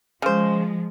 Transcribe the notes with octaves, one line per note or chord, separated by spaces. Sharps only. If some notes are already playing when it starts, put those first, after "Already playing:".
C#3 F3 G#3 C5